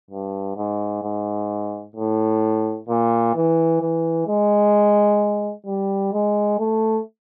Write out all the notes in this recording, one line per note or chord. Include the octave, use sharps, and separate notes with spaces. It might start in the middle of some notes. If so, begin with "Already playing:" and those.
G2
G#2
G#2
A2
A#2
E3
E3
G#3
G3
G#3
A3